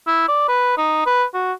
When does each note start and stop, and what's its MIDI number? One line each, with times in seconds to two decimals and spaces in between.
0.07 0.25 64
0.28 0.45 74
0.48 0.74 71
0.78 1.05 63
1.06 1.24 71
1.34 1.52 66